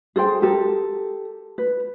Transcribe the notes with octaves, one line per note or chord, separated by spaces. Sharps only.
G#4 A4 C5 G5
G4 A4 A#4
B4